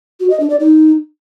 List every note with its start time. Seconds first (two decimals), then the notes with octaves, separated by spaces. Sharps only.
0.20 F#4
0.30 D#5
0.40 D4
0.50 D5
0.60 D#4